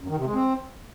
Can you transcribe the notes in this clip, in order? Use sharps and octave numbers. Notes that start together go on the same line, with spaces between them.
F#2
D#3
C3
G#3
C4